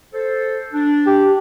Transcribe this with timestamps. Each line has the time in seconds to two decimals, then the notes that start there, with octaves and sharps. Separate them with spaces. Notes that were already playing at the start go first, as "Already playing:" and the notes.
0.14 A4 C5
0.74 D4
1.07 G4